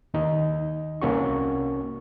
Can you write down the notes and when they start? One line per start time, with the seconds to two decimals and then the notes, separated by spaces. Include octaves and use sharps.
0.14 D#2 D#4
1.02 C2 A#3 C#4 F#4 C#6